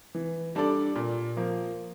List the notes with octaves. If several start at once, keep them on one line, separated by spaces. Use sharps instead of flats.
E3
G3 D4 A4 D5
A#2
F3 A#3